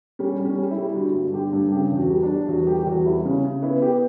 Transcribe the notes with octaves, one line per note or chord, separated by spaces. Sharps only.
G3 C#4
G3
C#4
G3
E4
G3
D3 F#4
G2
D3 G4
G2
C#3 G4
E2
F#4
G3
D4
G3
E2 F#4
G3 G4
G4
E2 F#4
G3 E4
C#3 C#4
C#3
B3 E4
B3 G4